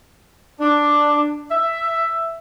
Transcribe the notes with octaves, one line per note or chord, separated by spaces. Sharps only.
D4
E5